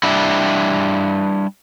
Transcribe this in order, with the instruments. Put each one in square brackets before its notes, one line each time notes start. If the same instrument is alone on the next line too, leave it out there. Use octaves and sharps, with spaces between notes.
[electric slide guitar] G3 D4 E4